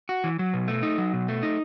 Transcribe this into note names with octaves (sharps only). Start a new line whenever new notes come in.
F#4
E3
F#3
B2
A3
D#4
F#3
B2
A3
D#4